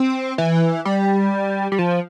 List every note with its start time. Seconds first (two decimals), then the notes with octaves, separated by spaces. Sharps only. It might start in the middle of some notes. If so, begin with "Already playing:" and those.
Already playing: C4
0.38 E3
0.85 G3
1.72 G3
1.79 F3